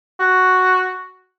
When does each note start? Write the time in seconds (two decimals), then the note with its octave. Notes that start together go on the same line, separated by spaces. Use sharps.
0.20 F#4